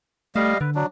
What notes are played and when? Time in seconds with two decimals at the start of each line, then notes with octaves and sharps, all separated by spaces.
0.36 G3 A3 D#5 F5
0.61 D3 B4
0.75 F#3 D4